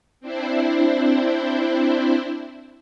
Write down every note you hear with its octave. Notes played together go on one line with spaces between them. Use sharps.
C4 D4 E4 C5